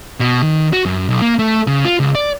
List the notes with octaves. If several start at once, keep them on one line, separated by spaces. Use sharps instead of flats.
B2
D#3
F#4
F#2
B1
A#3
A3
C#3
F4
C#2
D5